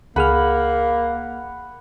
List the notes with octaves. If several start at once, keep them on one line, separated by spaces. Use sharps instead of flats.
C#2 A#3 G#4 F#5 B5 F6